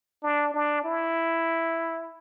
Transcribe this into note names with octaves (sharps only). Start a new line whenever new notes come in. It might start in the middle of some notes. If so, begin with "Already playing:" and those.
D4
D4
E4